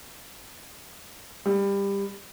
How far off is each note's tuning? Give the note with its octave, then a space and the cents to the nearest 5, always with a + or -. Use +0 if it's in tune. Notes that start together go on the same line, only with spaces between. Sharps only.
G3 +20